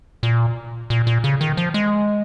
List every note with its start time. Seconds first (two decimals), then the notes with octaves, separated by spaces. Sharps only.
0.23 A#2
0.90 A#2
1.07 A#2
1.24 C#3
1.41 D#3
1.57 F3
1.74 G#3